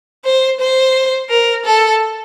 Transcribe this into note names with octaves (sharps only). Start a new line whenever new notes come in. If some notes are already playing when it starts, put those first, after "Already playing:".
C5
C5
A#4
A4